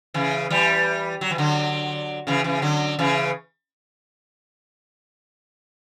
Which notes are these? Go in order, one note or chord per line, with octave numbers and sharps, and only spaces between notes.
C#3 E3
E3 G3
F#3
E3
D3 F#3
C#3 E3
C#3 E3
D3 F#3
C#3 E3